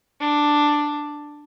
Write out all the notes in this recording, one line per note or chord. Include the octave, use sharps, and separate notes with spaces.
D4